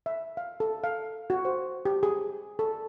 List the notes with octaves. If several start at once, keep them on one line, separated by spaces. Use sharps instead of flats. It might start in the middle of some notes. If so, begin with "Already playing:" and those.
E5
F5
A4
F5
F#4
C5
G4
G#4
A4